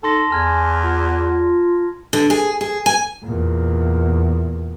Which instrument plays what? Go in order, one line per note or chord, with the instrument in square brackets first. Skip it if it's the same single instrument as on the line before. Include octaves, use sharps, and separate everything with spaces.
[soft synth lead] D#4 [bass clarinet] A4 [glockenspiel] A5 C6 A#6
[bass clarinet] E2 [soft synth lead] G#5 [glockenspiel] A#5 F6 G#6
[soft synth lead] F4
[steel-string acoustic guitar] D3
G#4
G#4
G#5
[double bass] E2 A#2